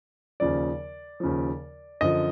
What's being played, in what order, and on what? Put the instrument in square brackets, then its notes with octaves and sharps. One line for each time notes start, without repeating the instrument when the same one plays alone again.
[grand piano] D#2 C#3 F3 D5
D#2 C#3 F3
F#2 D3 F3 D#5